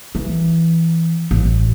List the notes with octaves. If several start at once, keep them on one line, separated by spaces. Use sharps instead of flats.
E3
A1